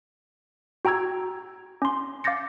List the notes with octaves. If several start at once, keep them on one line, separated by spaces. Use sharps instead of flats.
F#4 G5 A#5 E6 G#6
C#4 C6
F5 D6 G6 A6 A#6 C#7